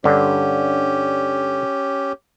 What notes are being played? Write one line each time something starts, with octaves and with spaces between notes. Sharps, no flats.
G2 D3 C#4 G4